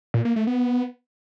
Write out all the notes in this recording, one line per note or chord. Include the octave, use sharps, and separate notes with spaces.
A#2
A#3
A3
B3